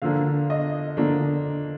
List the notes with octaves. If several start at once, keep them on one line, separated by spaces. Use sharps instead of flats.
D3 F3 A#3 D4 F5
D#5
D3 F3 A#3 D4